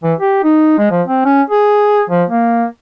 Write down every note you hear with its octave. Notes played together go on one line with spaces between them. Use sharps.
E3
G4
D#4
G#3
F3
C4
C#4
G#4
F3
A#3